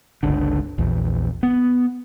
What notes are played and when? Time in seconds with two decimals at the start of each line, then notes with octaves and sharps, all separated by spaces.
0.23 G1 C#2 D3
0.78 A#1 E2
1.43 B3